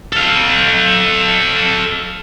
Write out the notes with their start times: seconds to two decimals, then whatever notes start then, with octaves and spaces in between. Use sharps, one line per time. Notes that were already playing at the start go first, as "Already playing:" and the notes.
0.13 A4 F5